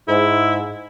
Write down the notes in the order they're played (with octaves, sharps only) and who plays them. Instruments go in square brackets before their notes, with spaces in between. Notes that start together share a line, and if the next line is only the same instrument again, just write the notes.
[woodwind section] G#2 [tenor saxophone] E4